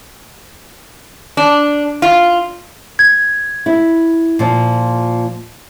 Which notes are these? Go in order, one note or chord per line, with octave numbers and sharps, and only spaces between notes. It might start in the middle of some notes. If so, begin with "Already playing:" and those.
D4
F4
G#6
E4
A#2 F3